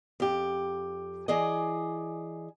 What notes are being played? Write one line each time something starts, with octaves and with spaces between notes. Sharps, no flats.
F2 G4
E3 G#4 D5 D#5